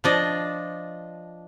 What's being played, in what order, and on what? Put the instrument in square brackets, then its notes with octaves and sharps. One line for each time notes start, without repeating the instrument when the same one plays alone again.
[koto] F3 D4 D#5